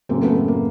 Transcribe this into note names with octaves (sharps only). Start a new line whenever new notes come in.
F#1 F#2 C#3 A#3 C4
A3 B3
A3
A#3